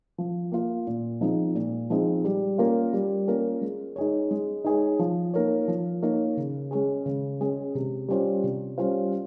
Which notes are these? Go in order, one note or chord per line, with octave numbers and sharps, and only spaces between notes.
F3
A#3 F4
A#2
F3 G#3 C4 D#4
A#2
F3 G#3 C4 D#4
G3
A#3 C#4 F4 A#4
G3
A#3 C#4 F4 A#4
G#3
D#4 G#4 C#5
G#3
D#4 G#4 C#5
F3
A#3 D#4 A#4 C#5
F3
A#3 D#4 A#4 C#5
C#3
G#3 C#4 G#4
C#3
G#3 C#4 G#4
C3
G3 C#4 F4 C5
C3
G3 C#4 F4 C5